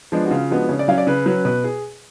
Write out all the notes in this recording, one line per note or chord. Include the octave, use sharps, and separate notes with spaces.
F3 G#3 B3 D4
F#4
C#3 F4
F3 G#3 B3 D4 F#4
C#3 C#5
D5
F#3 C#4 F5
D5
C#3 B4
F#3 C#4 B4
B2 B4
G#4